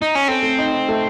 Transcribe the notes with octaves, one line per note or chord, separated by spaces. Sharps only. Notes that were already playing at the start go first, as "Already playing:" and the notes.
D#4
C#4
C4 A4
A3
D#4
D#4
A3